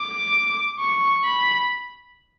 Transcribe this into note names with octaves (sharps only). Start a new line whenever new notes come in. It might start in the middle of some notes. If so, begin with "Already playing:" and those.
Already playing: D6
C#6
B5